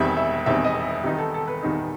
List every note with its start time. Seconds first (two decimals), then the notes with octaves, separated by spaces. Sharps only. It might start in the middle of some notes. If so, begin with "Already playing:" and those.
Already playing: E1 E2 D#3 G3 C4 E5
0.17 E5
0.46 E1 E2 D#3 G3 C4 E5
0.65 D#5
1.04 E2 D#3 G3 D#4 G4
1.18 A4
1.34 A4
1.48 B4
1.63 E2 D#3 G3 D#4